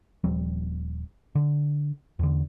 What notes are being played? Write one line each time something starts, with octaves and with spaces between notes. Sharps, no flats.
D#1 F3 G3 C4
D3
E2 D3